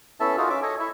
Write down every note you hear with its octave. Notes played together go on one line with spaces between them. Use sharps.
B3 C#4 E4 A4 E5 A5
D#4 F4 F#4 G#4 A#4
C#4 E5 D6
A4 C#5 D#5
E4 C#5 E5